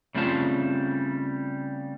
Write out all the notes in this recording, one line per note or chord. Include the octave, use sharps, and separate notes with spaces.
C#3 G3 A3 C4 F4 A5